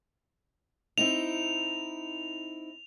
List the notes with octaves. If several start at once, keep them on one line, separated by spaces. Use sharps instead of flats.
C4 D#4 E4 F7